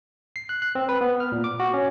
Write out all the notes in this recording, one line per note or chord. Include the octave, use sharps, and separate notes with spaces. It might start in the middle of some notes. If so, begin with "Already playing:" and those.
C7
F#6
F#6
C4
B4
B3
F6
A#2
D6
F#4
C#4